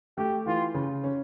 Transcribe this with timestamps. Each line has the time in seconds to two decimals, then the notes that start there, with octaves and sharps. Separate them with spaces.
0.18 A3 G4
0.46 E3 F4
0.74 C#3
1.04 C#4